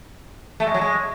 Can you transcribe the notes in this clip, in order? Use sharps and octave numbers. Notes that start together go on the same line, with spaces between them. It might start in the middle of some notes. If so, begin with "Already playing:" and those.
A3
G#3
F#3
G#3